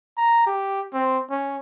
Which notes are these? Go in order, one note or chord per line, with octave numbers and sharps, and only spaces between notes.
A#5
G4
C4
C#4